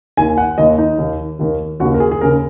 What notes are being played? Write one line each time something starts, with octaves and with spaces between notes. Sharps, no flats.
D#2 D#3 A#3 G#5
F#5
D#2 D#3 A#3 D#5
D#4
D#2 D#3 A#3
D#2 D#3 A#3
D#2 C#3 A#3 F#4
A#4
G#4
G#4
D#2 C#3 A#3 A#4